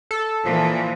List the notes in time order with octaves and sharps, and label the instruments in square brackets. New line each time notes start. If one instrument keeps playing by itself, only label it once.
[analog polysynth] A4
[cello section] A#2 E3 [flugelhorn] F3